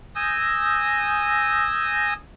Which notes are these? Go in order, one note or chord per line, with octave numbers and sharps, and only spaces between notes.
G#5 D#6 E6 G6 A#6